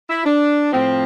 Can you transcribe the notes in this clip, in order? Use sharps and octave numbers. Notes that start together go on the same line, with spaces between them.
E4
D4
A2 F3 C4